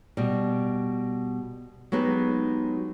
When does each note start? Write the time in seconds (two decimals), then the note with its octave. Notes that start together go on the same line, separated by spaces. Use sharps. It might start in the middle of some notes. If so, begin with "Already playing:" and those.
0.17 B2 G3
1.92 F#3 G#3 B3 D#4 G4